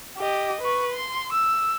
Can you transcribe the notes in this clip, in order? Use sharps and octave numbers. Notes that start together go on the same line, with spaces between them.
G4 D#5
B4 C#6
C6
E6